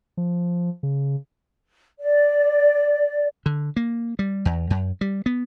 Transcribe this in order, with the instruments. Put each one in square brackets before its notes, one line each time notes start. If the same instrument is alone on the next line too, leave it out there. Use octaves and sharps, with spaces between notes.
[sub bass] F3
C#3
[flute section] D5
[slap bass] D3
A#3
G3
E2
F#2
G3
B3